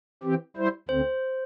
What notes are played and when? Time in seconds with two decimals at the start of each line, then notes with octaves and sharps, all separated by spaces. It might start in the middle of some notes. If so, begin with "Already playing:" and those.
0.23 E3 C4 G4
0.57 G3 E4 C5
0.89 D2 D3 C4 C5